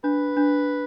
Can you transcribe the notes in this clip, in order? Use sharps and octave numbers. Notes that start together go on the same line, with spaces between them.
D4 B4
D4